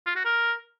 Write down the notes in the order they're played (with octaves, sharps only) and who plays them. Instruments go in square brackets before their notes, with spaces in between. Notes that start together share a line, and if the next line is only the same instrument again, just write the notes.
[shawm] F4
F#4
A#4